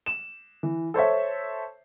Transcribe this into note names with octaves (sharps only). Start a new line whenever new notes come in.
E7
E3
A4 C5 C#5 E5